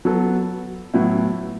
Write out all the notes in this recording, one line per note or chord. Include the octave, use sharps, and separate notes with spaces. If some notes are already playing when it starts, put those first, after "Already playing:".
F#3 B3 A4
A2 F#3 B3 E4